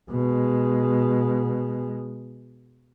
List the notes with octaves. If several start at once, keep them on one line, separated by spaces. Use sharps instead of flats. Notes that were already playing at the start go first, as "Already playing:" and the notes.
B2 G#3